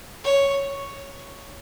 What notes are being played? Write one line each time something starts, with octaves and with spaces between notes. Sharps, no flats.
C#5